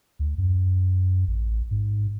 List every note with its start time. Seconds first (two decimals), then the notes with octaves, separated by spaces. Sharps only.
0.19 D2
0.38 F#2
1.27 A1
1.71 G#2